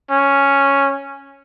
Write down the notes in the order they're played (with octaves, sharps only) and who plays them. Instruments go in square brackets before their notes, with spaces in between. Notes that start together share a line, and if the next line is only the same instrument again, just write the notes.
[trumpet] C#4